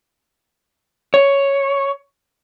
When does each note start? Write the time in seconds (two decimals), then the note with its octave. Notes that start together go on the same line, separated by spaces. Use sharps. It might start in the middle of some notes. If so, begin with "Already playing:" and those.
1.14 C#5